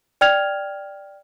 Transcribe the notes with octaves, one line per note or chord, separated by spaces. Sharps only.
D5 G5 F6 G#6 F7